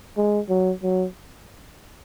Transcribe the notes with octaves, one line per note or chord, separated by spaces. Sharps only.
G#3
F#3
F#3